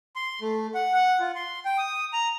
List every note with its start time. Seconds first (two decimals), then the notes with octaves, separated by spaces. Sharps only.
0.16 C6
0.41 A3
0.74 F#5
0.94 F#5
1.20 F4
1.35 C6
1.65 G5
1.78 D#6
2.13 A#5